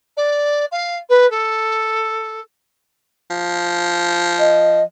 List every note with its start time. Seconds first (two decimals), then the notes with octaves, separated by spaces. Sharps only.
0.17 D5
0.72 F5
1.09 B4
1.31 A4
3.30 F3
4.39 D#5